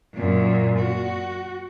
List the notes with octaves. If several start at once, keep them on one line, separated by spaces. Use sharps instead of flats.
F#2 A#2
F#4